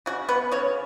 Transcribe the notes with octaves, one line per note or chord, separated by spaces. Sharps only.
C#3 F#4
B3 B4
C#3 C#5